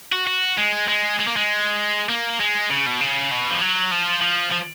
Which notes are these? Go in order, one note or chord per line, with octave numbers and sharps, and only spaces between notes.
F#4
F#4
G#3
G#3
G#3
A#3
G#3
A#3
G#3
C#3
B2
C#3
B2
F3
F#3
F3
F3
F3